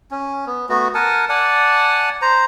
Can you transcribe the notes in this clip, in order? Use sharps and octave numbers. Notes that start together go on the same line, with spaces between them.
C#4
B3
A3 B3 F#4
A#4 F#5 G#5 A5
D5 F#5 G#5 A5
C5 A#5